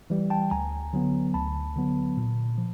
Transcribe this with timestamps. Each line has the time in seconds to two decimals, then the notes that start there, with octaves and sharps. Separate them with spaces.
0.10 E3 G3
0.30 G5 A5
0.51 D2 G#5 A#5
0.93 D3 F#3 B3
1.34 D2 A5 B5
1.76 D3 F#3 B3
2.17 A#2
2.58 F3